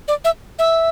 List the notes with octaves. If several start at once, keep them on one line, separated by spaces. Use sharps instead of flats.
D5
E5
E5